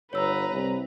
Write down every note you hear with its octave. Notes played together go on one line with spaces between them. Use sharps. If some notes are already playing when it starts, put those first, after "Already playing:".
G1 B4 C#5 A#5 E6
C2